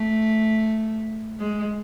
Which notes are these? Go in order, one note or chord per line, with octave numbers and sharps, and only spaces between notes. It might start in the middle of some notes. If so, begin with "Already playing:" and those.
Already playing: A3
G#3